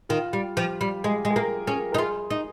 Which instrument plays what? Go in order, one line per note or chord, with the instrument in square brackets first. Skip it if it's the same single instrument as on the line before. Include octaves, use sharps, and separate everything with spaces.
[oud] D#3 [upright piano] F4
[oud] G3
[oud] F3 [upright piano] G4
[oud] G3
[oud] G#3 [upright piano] G#4
[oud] G#3
[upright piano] G#4
[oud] A#3 [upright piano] A#4
[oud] C#4 [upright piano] G#4
[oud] D#4 [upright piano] A#4
[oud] F4 [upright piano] G#4
[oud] D#4